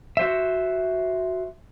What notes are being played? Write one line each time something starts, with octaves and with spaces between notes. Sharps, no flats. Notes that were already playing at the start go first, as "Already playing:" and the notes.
F#4 C5 E5